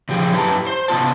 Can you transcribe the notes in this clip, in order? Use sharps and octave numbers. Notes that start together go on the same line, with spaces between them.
C#3 F3 G4 G#4
F#2 E4 G4 B4 A5 A#5
C5
C3 B3 F4 A5